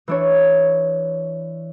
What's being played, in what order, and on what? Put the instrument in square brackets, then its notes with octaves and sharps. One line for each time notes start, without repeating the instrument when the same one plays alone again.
[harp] E3 D4 C#5